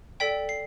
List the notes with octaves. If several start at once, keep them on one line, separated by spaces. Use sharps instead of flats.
A4 D5 G5 B6
C7